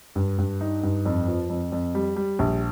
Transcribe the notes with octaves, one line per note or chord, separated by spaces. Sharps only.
G2
G2
D#4
G2
F2
F3
F2
F2
G3
G3
A#1